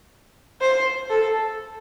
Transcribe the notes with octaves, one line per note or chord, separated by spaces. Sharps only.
C5
A4